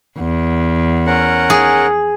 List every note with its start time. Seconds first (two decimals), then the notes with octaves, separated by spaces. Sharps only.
0.18 E2
1.06 C#4 A#4 F#5
1.50 G#4